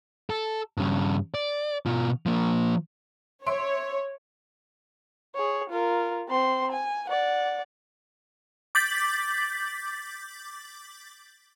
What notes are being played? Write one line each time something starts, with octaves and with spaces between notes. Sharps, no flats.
A4
G2 C#3
D5
B2 F4
F3 A#3
C#5 E5 C6 D7
G#4 C#5
F4 A#4
C4 C6
G#5
D5 F#5
D6 G6 A6 B6 F#7